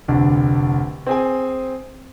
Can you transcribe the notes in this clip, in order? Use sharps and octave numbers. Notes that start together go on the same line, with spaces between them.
F1 D2 D4
C4 G#4 G#5